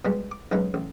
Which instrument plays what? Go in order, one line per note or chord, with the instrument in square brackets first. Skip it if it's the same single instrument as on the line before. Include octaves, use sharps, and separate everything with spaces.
[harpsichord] B2 G3 G#3
D6
B1 C#3 G#3 D#4 B4
A1